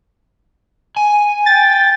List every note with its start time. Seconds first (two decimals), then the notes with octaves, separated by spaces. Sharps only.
0.97 G#5
1.46 G5 A6